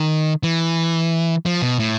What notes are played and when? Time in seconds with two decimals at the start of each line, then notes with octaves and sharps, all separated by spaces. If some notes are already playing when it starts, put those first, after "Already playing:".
Already playing: D#3
0.43 E3
1.46 F3
1.62 B2
1.79 A2